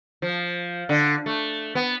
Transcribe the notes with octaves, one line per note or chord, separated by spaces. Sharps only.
F3
D3
A3
B3